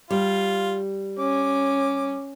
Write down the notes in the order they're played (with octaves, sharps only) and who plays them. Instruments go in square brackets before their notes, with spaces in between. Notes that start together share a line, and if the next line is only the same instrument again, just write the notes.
[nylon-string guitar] G3 [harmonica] F4
[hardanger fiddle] C#4 [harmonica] D6